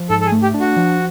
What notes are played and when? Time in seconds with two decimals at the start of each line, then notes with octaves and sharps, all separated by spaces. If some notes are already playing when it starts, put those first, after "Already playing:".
Already playing: F3
0.10 G#2 A4
0.21 A4
0.26 G#4
0.32 A3
0.42 G4
0.54 D4
0.60 F#4
0.76 F3